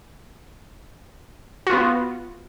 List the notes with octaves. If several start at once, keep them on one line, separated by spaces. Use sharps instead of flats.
B3 F4 F#4